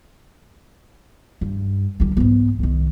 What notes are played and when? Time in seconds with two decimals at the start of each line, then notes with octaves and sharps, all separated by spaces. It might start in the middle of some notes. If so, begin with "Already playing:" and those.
1.41 G2
2.00 D3 G3
2.17 G#2 B3
2.59 C2 D#3